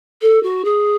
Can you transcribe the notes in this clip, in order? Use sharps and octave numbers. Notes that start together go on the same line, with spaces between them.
A4
F#4
G#4